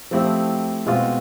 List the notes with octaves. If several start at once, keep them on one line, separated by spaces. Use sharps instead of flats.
F3 A3 C4 E4 G4
B2 G#3 C4 F4